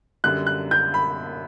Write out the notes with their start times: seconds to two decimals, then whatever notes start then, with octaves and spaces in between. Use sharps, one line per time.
0.24 F#2 D3 G3 F#6
0.47 F#6
0.71 G6
0.94 B5